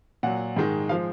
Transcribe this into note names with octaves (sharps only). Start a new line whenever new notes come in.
A#2 F#3 F#5
G#2 D#3 G#3
F3 G#3 F5